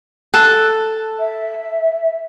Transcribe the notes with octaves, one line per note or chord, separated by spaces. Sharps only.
A4 A5 F#6
E5